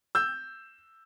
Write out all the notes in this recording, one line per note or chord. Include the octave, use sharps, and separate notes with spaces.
E6 G6